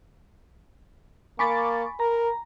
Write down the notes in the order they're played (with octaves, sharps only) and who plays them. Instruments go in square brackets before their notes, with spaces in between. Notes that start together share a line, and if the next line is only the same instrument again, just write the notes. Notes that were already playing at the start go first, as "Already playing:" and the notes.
[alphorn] A#3 [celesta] G#5 B5 B6 [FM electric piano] C#6 D6 A6
[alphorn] A#4 [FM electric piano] A#5